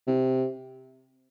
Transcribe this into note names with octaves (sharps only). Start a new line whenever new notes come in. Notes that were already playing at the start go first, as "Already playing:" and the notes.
C3